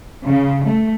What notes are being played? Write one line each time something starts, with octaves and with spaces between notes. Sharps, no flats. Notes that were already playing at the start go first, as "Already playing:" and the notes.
C#3
A3